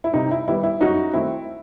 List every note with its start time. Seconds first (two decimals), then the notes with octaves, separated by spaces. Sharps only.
0.04 E4
0.13 C3 D#4
0.31 E4
0.48 D#3 G3 B3 E4
0.63 E4
0.81 F#2 D#4 F#4
1.14 D#3 A3 C4 E4